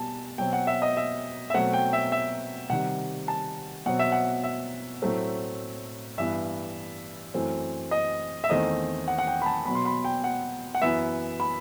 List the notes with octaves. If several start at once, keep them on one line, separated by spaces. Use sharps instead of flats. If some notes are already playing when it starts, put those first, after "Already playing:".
Already playing: B2 G3 A5
B2 F#3 C4 G5
F#5
E5
D#5
E5
E5
B2 F#3 A3 C4 F#5
G5
E5
E5
C3 D#3 G3 F#5
A5
B2 F#3 C4 F#5
E5
F#5
E5
A2 F#3 A3 C4
G2 E3 B3 E5
F#2 E3 A3 C4
D#5
E5
E2 D#3 A3 C4 D#5
F#5
F#5
G5
B5
A5
B2 F#3 B3 B5
C6
B5
G5
F#5
F#5
F#2 E3 B3 E5
B5